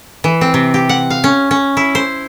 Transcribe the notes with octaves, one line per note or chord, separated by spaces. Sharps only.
E3
C4
C3
G4
F#5
F5
C#4
C#4
E4
C5